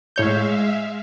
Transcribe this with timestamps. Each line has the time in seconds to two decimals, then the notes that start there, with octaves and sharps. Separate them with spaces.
0.16 A2 G#3 C#5 E5 F5 G6